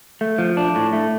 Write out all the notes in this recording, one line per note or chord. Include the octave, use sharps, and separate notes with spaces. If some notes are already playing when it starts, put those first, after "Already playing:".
A3
F3
D4
A2
A3